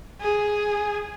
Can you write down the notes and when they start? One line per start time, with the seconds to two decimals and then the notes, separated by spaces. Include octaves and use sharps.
0.21 G#4